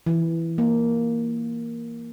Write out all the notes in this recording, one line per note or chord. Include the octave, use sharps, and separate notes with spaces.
E3
A#3